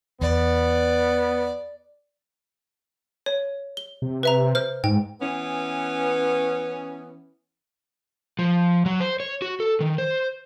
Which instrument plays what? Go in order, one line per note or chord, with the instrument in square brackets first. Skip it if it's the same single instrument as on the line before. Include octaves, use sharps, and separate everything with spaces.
[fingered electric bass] E2 [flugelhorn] B3 [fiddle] D5
[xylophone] C#5
G7
[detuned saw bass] C3
[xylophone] B4 E5 A#5
C5 F6
[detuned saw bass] G#2 [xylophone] G5
[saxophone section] E3 B3 C#4
[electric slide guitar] F3
F#3
C5
C#5
F#4
A4
D#3
C5